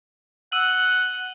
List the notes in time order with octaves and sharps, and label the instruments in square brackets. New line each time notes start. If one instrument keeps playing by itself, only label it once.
[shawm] F#5 [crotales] E6 D#7 F#7